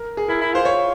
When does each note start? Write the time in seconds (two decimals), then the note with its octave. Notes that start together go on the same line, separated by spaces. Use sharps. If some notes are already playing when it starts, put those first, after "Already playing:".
Already playing: A#4
0.17 G#4
0.28 E4 A#4
0.41 E4
0.53 F4 C5
0.65 C#5